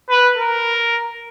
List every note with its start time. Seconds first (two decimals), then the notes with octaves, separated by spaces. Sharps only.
0.10 B4
0.38 A#4